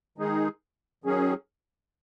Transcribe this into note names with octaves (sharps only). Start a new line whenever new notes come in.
D#3 G#3 D#4 G#4
D#3 F#3 C#4 G#4